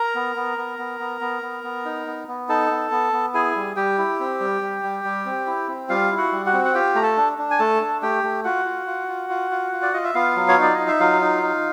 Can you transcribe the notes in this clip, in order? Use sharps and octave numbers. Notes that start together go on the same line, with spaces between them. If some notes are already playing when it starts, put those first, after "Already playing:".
Already playing: A#4 A#5
B3
B3
B3
B3
B3
B3
B3
B3
D#4
B3
B3
D#4 A4 A5
B3
B3
B3
E4 G#4 G#5
G3
G3 G4 G5
E4
C4
G3
G3
G3
G3
C4
E4
C4
G3 F4 F5
E4
F#4 F#5
G3
F#4 F#5
C4
F#5
F4 G4 G5
A3 A#5
A4 A5
D4
D4
G#5
A3 A4 A5
D4
A3 G4 G5
A3
F4 F#4 F#5
F4
F4
F4
F4
F4
F4
D5
F4 D#5
E5
B3 F4 F5
F#3
C#5
D#4 D5
D#4 D#5
E5
F#3 F4 F5
D#4
D#4